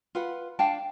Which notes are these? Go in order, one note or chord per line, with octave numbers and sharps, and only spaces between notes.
F4 B4 F#5
D4 F5 G5 A5